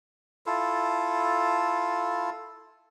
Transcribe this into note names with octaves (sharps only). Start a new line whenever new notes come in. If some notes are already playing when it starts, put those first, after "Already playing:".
E4 F4 A4